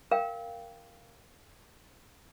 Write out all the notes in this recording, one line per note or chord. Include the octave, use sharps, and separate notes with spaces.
A#4 F5 G5